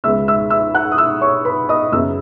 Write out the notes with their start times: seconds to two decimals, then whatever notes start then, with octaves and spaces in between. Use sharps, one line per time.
0.04 C#2 C#3 G#3 B3 E5 E6
0.28 E5 E6
0.50 E5 E6
0.74 F#5 F#6
0.92 D#6
0.98 E5 E6
1.21 C#5 C#6
1.45 B4 B5
1.69 D#5 D#6
1.92 F#2 C#3 F#3 B3 E5 E6